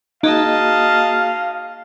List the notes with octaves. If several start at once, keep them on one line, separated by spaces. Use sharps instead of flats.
A#3 D#4 F#4 G#4 D#5 F5 A5